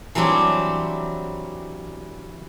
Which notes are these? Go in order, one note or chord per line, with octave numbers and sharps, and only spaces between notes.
E3 F#3 G3 C4 D4